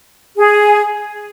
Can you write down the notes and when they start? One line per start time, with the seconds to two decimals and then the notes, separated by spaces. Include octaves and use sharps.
0.38 G#4